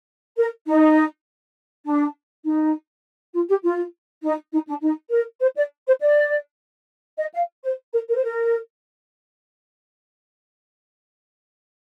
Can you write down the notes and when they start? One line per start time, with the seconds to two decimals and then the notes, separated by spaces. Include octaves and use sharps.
0.36 A#4
0.66 D#4
1.85 D4
2.43 D#4
3.33 F4
3.48 G4
3.62 F4
4.22 D#4
4.52 D#4
4.67 D4
4.81 D#4
5.10 A#4
5.40 C5
5.55 D5
5.85 C5
6.00 D5
7.18 D#5
7.33 F5
7.63 C5
7.92 A#4
8.08 A#4
8.14 C5
8.23 A#4